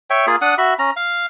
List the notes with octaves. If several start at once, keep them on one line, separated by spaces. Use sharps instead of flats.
C#5 E5 G5
A#3 F4 G#4
D4 F#5 D#6
F#4 E5 B5
C#4 A#5
F5